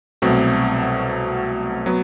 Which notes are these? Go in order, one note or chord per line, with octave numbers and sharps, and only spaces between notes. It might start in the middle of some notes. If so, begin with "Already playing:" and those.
C2 B2 F#3 A3 C4
F#3 B3